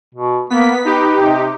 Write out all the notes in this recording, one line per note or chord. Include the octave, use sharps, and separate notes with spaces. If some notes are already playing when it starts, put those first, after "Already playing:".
B2
A#3 B3 B6
D#4 G4 B4
C3